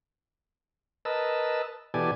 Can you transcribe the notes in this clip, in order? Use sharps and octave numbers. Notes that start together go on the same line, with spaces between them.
A#4 B4 D#5 A5 E6
B2 E3 G4 A4 D5 G#5